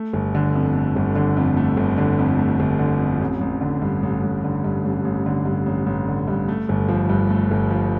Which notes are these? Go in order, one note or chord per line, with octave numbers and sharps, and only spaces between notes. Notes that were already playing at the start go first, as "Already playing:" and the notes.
Already playing: A3
G1
D3
F2
A3
G1
D3
F2
A3
G1
D3
F2
A3
G1
D3
F2
A1
A1
D3
G2
A1
A1
D3
G2
A1
A1
D3
G2
A1
A1
D3
G2
A3
G1
F3
G2
A3
G1
F3